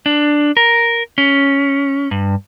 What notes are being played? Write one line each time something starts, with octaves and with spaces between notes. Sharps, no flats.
D4
A#4
C#4
G2